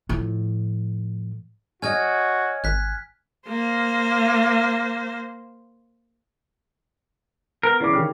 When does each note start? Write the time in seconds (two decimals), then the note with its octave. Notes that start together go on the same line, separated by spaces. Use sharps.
0.09 A2 F3
1.82 F#4 C#5 D#5 G#5 F6 G#6
2.64 G#1 F#6 B6
3.48 A#3 C5
7.63 B3 A#4
7.80 C#3 E3 D5 D6
7.93 D#3 G4 F6